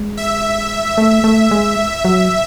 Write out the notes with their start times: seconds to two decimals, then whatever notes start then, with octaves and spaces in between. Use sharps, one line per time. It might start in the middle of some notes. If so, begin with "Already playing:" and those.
Already playing: G#3
0.17 E5
0.98 A3
1.24 A3
1.51 G#3
2.05 F#3